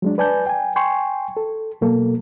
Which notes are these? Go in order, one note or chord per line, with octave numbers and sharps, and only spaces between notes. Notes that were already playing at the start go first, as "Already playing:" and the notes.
F#3 G#3 D4
B4 D5 G#5 A5 G6
G5 G#5
G5 G#5 C6 C#6
A4
B2 F#3 A#3 A4